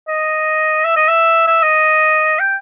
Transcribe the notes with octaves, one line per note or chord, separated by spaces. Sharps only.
D#5
E5
D#5
E5
E5
D#5
G5